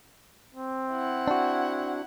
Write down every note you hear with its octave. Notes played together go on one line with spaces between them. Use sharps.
C4
E4 F#5
D4 F#4